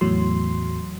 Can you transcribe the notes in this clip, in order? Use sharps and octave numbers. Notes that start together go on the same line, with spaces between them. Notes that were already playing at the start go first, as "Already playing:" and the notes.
E2 A2 F#3 C6